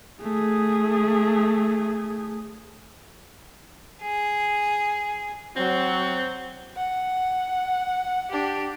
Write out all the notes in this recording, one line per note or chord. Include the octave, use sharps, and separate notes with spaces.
A3 G#4
G#4
F#3 C4
F#5
D4 G4